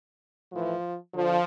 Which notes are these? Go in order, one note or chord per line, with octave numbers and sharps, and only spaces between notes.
A2 E3 F3
D3 F3